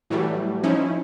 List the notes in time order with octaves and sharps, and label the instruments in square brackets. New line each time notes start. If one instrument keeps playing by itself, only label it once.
[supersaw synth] A2 E3 F#3 G3 A3
F3 C#4 D#4 E4